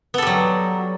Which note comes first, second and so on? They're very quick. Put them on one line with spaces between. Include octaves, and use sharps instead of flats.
B3 A4 G3 F#3